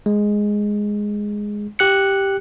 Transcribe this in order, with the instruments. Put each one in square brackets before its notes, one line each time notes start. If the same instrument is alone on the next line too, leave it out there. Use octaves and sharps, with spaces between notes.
[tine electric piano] G#3
G4 F#6 C#7